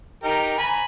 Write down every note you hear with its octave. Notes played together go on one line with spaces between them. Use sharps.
D#4 G4 A#4
G#5 A#5 B5